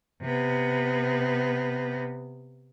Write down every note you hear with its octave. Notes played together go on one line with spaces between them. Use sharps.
C3 B3